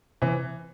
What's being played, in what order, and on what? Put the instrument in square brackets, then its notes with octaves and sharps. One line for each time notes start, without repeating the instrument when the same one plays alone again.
[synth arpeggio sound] C3 [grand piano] E3